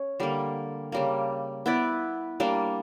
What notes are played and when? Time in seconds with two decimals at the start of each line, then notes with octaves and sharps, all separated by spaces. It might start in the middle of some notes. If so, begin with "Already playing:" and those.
Already playing: C#4 C#5
0.20 D3 G3 A#3
0.92 C#3 G3 A#3
1.66 B3 E4 B4 D5
2.40 G3 A#3 D4